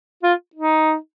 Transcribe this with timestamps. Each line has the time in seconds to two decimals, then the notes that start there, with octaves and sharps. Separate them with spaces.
0.23 F4
0.55 D#4